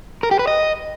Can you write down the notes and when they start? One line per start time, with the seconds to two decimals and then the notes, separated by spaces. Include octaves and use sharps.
0.23 A#4
0.31 G4
0.39 B4
0.47 D#5